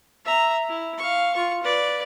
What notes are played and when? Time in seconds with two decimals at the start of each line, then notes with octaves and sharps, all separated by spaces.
0.24 E5 A#5
0.69 E4
0.98 F5 C#6
1.34 F4 C#6
1.63 B4 D5